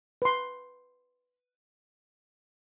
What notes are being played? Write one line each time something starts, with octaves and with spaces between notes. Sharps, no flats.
B4 C6